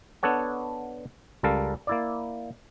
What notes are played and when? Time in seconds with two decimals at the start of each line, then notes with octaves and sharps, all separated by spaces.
0.23 B3 D4 A4 C#5 F#5
1.43 C#2 G3 A4 A#4 F5
1.87 A#3 E4 D5